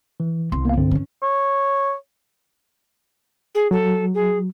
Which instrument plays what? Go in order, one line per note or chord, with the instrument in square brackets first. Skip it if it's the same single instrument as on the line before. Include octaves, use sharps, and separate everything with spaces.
[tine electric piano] E3
[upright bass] C2 [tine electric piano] C6
[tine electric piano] A#3 B3 F5
G2 D3 C4
[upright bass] E3 C#4
[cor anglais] C#5
[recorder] G#4
[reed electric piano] F#3 [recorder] A4
[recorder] G#4